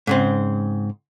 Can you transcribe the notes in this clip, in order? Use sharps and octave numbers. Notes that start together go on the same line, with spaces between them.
G#2 C#3 C4